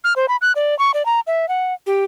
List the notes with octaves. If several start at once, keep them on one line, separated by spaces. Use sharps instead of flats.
F6
C5
B5
F#6
D5
C#6
D5
A#5
E5
F#5
G4